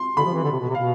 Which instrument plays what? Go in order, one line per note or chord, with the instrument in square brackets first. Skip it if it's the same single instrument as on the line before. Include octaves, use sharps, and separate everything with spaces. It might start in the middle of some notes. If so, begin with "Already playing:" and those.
Already playing: [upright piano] C6
[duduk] D3 [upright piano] B5
[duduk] F3
E3
D3
C3
B2
C3
[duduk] B2 [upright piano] F5